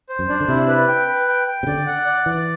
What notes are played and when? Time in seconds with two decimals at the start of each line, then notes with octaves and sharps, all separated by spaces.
0.09 C5
0.19 F#2
0.29 D4
0.40 D3
0.48 C3 E4
0.68 B4
0.88 G5
1.08 B4
1.28 G5
1.47 G5
1.63 C3
1.67 D3 D5
1.87 F#5
2.06 D5
2.26 E3 D5